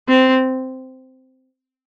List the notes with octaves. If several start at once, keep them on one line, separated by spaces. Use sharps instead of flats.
C4